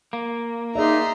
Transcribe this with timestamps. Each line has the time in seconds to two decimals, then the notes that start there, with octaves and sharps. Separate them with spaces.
0.13 A#3
0.75 D#4 G#4 D5 E5 A#5 C6